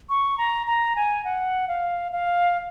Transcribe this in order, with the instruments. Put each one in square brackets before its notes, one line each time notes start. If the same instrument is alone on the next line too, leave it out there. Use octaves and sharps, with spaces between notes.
[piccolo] C#6
A#5
A#5
G#5
F#5
F5
F5